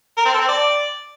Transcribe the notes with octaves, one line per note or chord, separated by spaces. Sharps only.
A#4
C4
A4
C4
D5